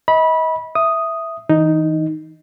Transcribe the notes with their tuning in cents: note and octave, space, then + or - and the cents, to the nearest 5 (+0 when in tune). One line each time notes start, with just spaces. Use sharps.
D#5 +35 B5 -20
E5 +0 D#6 +0
E3 -35 D#4 +0